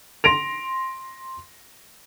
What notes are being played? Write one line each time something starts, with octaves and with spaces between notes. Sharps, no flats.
C6 A#6 D7 F7